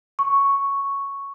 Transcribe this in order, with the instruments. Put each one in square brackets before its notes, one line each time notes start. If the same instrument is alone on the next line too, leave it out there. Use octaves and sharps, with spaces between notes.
[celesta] C#6